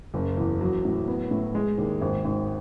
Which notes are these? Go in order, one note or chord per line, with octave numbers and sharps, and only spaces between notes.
F#1
E2
F#3
A2
B3
A2
G#3
D#2
G#1
G#1